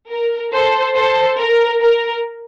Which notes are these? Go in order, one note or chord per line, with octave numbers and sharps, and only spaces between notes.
A#4
A4 C5
A4 C5
A#4
A#4